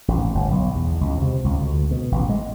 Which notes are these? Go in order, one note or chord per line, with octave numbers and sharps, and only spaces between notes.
A1
G1
B1
E2
C#2
C3
C#2
D2
B2
A1
G#3